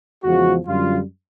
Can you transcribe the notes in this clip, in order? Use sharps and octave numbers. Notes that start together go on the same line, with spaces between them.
E2 C#3 F3 G#3 F#4
F#2 D3 G3 F4